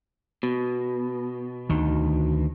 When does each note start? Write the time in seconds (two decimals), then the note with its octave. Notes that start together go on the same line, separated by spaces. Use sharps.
0.43 B2
1.69 D2 D#3